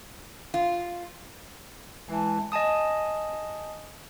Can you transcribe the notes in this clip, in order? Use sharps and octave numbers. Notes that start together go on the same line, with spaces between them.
F4
E3 G#3 A5
D#5 G#5 A5 D#6